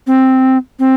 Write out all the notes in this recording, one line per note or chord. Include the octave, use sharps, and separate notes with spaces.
C4
C4